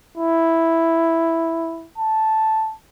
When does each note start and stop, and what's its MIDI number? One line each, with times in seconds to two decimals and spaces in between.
0.18 1.87 64
1.98 2.74 81